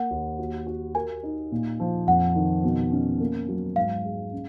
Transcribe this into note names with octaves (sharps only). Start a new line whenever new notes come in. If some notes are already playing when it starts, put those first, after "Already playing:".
Already playing: A#3 F#5
D#2
F#4
F#4
A#4 G#5
D#4
A#2
F3
F2 F#5
D#3
B2
C#4
A#3
F#3
G#2 F5
G#3
C#4